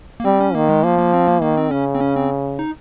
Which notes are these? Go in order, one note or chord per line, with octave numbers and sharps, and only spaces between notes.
A#3
G3 C4
C#4
D#3 A#3
G#3
F3 A#3
A#3
C4
A#3
D#3 A#3
C4
C#3 C#4
C4
C#4
C4
D#4